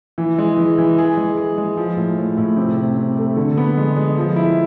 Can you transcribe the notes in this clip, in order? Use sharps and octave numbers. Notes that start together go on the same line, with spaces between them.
E3
G#3
E3
E3
G#4
G#3
G#4
G#3
F3
A2
A2
A2
C3
C3
C3
A3
D3
B3
G#3
G#3
F3
E4